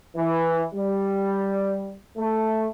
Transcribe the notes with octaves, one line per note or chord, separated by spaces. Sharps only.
E3
G3
A3